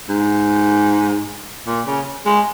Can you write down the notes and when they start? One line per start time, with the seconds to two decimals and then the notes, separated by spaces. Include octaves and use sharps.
0.09 G#2
1.67 A#2
1.87 C#3
2.26 G#3